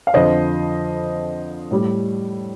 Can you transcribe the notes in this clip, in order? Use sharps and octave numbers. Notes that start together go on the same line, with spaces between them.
F5
F2 D3 F3 C5 D#5
A2 G3